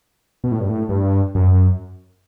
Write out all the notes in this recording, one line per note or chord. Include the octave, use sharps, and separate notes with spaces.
B2
A2
G2
A2
G2
F#2